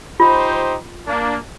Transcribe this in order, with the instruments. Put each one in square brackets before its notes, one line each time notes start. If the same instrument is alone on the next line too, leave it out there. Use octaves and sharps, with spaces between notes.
[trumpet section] D#4 G4 C5 [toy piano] F4
[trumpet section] A#3 D4